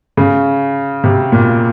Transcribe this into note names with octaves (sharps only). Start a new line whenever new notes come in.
C#3
C3
A#2